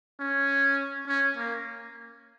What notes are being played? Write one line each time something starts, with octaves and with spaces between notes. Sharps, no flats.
C#4
C#4
A#3